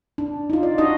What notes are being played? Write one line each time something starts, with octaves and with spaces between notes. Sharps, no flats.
D4
D#4 F4
D5
D4 D#4 F#4 D#5